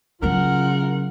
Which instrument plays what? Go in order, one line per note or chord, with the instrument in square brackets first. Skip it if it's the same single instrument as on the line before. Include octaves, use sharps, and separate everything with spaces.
[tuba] C#3 [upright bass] F#3 D4 [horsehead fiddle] F4 F#5 [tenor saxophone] A#4